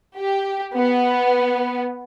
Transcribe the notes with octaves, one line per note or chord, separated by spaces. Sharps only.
G4
B3